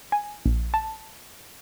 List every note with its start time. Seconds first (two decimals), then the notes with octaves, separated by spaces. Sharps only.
0.12 G#5
0.46 A#1
0.74 A5